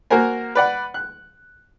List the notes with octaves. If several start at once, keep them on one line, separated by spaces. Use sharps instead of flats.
A#3 F#4 A#4 C5 G#5
B4 D5 F#5
F#6